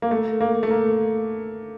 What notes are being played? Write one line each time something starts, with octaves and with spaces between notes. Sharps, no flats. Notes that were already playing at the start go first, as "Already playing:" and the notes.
A#3
A3
A#3
A3
A#3